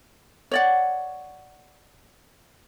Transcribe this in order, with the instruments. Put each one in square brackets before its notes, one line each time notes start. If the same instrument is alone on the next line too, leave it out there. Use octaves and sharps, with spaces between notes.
[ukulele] C#5 D5 F#5